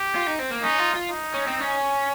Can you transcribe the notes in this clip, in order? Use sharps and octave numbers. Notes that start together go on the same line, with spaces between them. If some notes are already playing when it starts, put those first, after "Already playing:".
Already playing: G4
F4
D#4
C4
A#3
C#4 D#4
F4
F4
D#4
C#4
C4
C#4